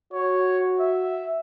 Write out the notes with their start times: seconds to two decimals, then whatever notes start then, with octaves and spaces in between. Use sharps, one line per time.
0.13 F#4 C#5
0.79 E5